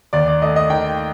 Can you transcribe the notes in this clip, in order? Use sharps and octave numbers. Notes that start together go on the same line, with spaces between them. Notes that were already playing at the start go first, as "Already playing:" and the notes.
D#2 D5
D5
A3 D#5
D#5
D#3 G5